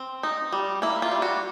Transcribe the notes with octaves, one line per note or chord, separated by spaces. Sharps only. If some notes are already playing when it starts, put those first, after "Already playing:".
Already playing: C4
D#4
G3
A#3 E4
F4
G3
F#4